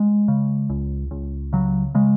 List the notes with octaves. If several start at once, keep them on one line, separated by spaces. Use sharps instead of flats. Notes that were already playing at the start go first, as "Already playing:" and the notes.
Already playing: G#3
C#3
C#2
C#2
C#3 F#3
C#3 G#3